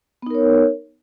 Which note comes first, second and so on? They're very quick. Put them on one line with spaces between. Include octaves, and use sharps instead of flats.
B3 D#4 A#4 C#5